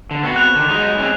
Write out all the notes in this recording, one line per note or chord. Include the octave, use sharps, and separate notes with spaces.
D3
B3 C4 F#4
F#6 F7
D3 D#3
F#3 G#3 D#4
G#3 C4 C#4